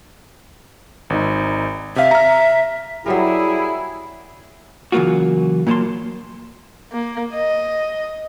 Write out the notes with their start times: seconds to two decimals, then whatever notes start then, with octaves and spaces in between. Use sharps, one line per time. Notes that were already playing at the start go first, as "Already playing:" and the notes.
1.10 G#1 D#4
1.96 C3 E5 F5
2.11 A#5 F6
3.06 F#3 G3 E4 G#4 A#4
4.92 C#3 E3 F#3 A#3 F4 F#4
5.67 A#2 F#3 A#3 A4 A5 C6
6.92 A#3
7.34 D#5